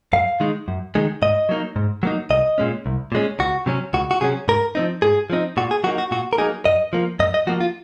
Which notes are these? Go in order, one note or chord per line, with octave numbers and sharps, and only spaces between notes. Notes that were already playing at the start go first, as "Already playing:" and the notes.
F#2 F5
D#3 G#3 D#4
F#2
D#3 G#3 D#4
G#2 D#5
F#3 A#3 D#4
G#2
F#3 A#3 D#4
C2 D#5
A#2 G#3 C#4
C2
A#2 G#3 C#4
C#2 F#4
C3 F#3 C#4
C#2 F#4
F#4
C3 F#3 C#4 G#4
G#2 A#4
F3 C4 D#4
G#2 G#4
F3 C4 D#4
A#2 F#4
G#4
F#3 A#3 D#4 F#4
F#4
A#2 F#4
A#4
F#3 A#3 D#4 G#4
F#2 D#5
F3 A#3
F#2 D#5
D#5
F3 A#3 F#4
F4